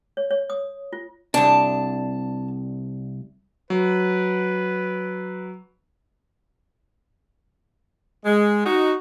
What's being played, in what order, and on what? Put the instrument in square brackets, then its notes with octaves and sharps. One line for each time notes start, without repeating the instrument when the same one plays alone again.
[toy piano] C#5
C#5
D#6
F4
[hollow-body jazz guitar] C2 D4 [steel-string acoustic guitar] A5
[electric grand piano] F#3 [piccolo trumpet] B4
[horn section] G#3
D#4 F#4